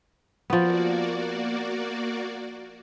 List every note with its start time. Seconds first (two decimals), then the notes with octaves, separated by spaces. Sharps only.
0.50 F3 A#3 B3 F#4 D5